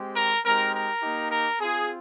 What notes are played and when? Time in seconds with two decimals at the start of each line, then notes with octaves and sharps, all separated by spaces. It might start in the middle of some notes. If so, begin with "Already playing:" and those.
Already playing: G#3 C4 G4
0.16 A#4
0.44 G#3 C4 D#4 G4 A#4
0.73 A#4
1.02 A#3 D#4 G4
1.30 A#4
1.59 C4 F4 G#4